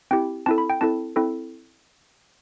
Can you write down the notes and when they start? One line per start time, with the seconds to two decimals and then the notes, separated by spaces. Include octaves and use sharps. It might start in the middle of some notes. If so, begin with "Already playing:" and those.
0.11 C4 E4 G4 G5
0.46 C4 E4 A4 A5
0.58 B5
0.70 G5
0.81 C4 E4 A4 A5
1.16 C4 E4 A4